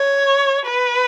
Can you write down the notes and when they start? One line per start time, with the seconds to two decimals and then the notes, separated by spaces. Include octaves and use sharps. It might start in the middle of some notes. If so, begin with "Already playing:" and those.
Already playing: C#5
0.66 B4